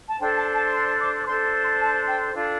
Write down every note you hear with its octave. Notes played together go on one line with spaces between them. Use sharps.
A5
D4 A4 C5 G5
A5
A5
C6
D6
D6
D4 A4 C5 C6
C6
A5
G5
D4 F4 A4